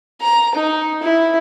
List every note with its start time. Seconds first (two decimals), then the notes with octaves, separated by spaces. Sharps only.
0.21 A#5
0.55 D#4
1.03 E4